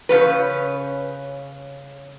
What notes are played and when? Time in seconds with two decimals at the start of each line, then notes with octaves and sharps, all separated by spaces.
0.09 C#3 C#4 B4